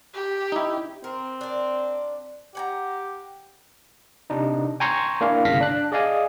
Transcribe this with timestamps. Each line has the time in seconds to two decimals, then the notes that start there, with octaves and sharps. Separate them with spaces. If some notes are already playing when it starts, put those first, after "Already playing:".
0.15 G4
0.52 D#4 E4
1.04 C4 A#4
1.41 D4 A#4
2.55 G4 F#5 G#5 A#5
4.30 C3 D4 D#4
4.80 G5 G#5 A#5 C6 C#6 G#6
5.21 A#3 D4 E4 F5
5.45 G1 C2 C#3 F5 A#6 B6
5.61 D4 F#6
5.92 G#4 D5 D#5 F5 G#5